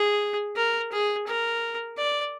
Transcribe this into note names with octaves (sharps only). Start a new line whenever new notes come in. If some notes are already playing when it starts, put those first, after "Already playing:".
Already playing: G#4
A#4
G#4
A#4
D5